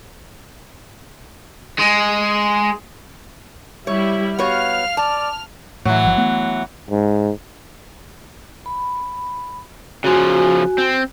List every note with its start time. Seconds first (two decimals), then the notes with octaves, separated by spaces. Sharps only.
1.79 G#3
3.87 G3 E4 C#5 E5
4.39 B3 F#4 C#5 F5 F6
4.97 D5 A5
5.85 A2 E3 F#3
6.04 G1 F3
6.18 A3 B3
6.91 G#2
8.66 B5
10.04 C#3 F3 F#4 G#5
10.78 C4